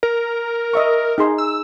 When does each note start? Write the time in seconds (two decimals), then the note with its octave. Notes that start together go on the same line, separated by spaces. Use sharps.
0.03 A#4
0.73 D#5 E5 C#6
1.18 D#4 G#4 C6
1.38 E6